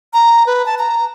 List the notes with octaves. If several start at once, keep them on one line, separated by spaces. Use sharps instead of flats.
A#5
B4
A5
A#5